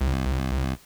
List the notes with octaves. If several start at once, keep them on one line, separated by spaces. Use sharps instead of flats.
C2